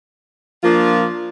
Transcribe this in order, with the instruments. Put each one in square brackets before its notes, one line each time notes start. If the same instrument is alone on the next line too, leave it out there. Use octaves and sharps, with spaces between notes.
[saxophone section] F3 A#3 D4 F4